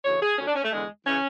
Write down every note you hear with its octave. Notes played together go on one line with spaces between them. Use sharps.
D2 C#3 E3 C#5
G#4
D2 D3 C#4
D4
C#4
A3
E2 D3 G#3
C#3 E3 C#4